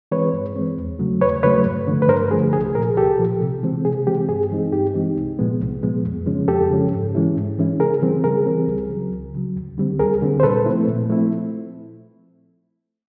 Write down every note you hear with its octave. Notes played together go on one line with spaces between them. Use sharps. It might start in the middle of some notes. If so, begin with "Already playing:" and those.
E3 G#3 C4 B4 C#5
G2
E3 G#3 C4
E2
C#3 F#3 A3
E2 B4 C#5
C#3 F#3 A3 B4 C#5
G2
D3 F3 A3
B4
G2 A#4 C5
D3 F3 A3 G#4
C2 G#4
A#2 F3 G#4 A#4
C2 G4 A4
A#2 F3
C3
E3 G#3 C4
C3 G#4
E3 G#3 C4 G4
G2 G#4
E3 G#3 C4 D#4
G2 G4
E3 G#3 C4 D#4
C2
A#2 F3 G#3 B3
C2
A#2 F3 G#3 B3
F2
C#3 F3 G#3 C#4
F2 G4 A4
C#3 F3 G#3 C#4
G#2
E3 G#3 C#4 E4
G#2
E3 G#3 C#4 E4
C#3 G#4 A#4
E3 G3 C4
C#3 G#4 A#4
E3 G3 C4
C#2
C#3 F#3
C#2
C#3 F#3
D2
D3 G3 C4
D2 G#4 A#4
D3 G3 C4
C5
A#2 A4 B4
F3 A3 C4 E4
A#2
F3 A3 C4 E4